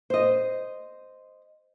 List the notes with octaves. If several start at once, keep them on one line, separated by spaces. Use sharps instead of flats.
C5 D#5